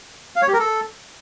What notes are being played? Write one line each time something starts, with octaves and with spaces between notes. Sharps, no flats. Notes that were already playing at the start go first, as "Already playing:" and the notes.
F5
C#5
G4
A#4
A4